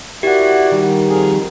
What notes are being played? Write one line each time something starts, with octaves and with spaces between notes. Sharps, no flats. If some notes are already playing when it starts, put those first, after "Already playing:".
E4 F#4 G4 A#4 D5 F#5
D#3 G3
F2 G#4 A#4